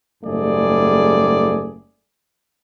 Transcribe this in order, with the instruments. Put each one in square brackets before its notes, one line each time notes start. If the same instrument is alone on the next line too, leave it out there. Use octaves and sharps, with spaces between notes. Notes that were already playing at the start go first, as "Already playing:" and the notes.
[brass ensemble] F#1 G#2 G3 A3 G#4 D5